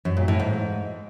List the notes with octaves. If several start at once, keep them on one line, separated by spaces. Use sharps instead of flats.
F#2
A#2
A2
G#2